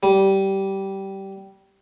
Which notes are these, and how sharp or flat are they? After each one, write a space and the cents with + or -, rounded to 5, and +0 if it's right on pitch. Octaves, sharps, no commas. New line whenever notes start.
G3 -15